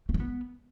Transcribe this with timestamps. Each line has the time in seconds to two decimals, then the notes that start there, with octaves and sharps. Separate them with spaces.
0.09 A3
0.14 G#3
0.20 B3